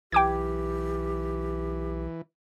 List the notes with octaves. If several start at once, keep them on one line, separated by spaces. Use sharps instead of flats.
B1 E3 G4 G5 D6 G#6